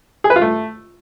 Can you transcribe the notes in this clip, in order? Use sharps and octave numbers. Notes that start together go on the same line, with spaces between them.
G#4
B4
F4
A3